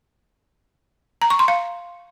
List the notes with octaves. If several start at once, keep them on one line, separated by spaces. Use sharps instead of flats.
A#5
C#6
C6
F5